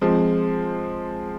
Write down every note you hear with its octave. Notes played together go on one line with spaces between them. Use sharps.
F3 G#3 C4